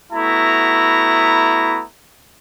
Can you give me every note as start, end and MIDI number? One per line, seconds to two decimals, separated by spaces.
0.12 1.81 57
0.12 1.81 59
0.12 1.81 64
0.12 1.81 66
0.12 1.81 82